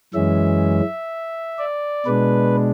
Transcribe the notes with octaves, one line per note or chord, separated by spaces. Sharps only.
F#2 E3 G#3 C#4 E5
D5
B2 G#3 D4 B4